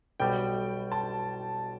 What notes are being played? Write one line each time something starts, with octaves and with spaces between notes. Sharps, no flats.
B1 B2 G3 G5
A5